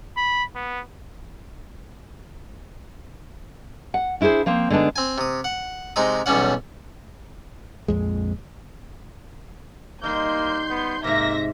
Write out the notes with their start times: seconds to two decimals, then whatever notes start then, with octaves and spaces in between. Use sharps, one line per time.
0.17 B5
0.55 B3
3.94 F#5
4.21 D4 E4 G4 G#4 C5
4.46 F3 A#3 C4
4.70 D3 G#3 B3 D4 D#4
4.96 C4 G#5
5.18 C3 D#6
5.44 F#5
5.96 C3 G#3 D#4 A#5 D#6
6.26 B1 E2 G3 C#4 F#5
7.88 A#1 F2 G#3
10.03 G3 A#3 D#4 C6 G6
10.71 B3
11.04 G#2 C3 A#3 E5 A#6